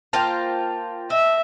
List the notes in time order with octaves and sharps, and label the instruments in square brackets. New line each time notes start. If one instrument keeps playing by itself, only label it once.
[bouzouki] A#3 F4 C5 [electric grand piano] G5 A5
[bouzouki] D#5 [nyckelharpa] E5